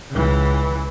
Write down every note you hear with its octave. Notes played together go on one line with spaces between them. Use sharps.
C#2 E3